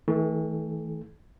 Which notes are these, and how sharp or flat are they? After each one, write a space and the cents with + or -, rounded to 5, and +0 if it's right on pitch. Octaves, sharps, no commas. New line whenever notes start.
E3 -45 A3 +0 A4 -45